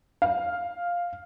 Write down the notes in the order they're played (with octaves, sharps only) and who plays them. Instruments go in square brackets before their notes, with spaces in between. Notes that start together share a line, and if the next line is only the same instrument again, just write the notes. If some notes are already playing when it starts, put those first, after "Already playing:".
[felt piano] F5